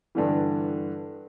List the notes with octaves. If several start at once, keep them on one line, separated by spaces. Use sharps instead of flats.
G2 D3 E3